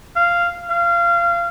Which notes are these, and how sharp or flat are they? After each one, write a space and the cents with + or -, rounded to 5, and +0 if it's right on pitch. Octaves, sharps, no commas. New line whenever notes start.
F5 -10
F5 -25